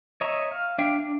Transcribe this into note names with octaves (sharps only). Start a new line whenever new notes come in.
C#5 D#5 E5 A#5 C#6
F5
D4 E5 F5 G5
D4